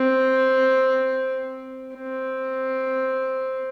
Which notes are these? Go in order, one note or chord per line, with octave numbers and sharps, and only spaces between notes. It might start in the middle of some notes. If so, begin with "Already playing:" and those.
Already playing: C4
C4